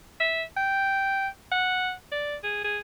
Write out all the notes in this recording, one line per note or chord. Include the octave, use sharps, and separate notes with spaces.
E5
G5
F#5
D5
G#4
G#4